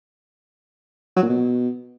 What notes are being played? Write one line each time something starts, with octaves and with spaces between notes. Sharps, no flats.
F#3
A#2
B2